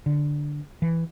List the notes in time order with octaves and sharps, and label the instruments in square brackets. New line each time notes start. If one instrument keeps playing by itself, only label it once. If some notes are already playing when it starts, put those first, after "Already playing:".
[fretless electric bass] D3
E3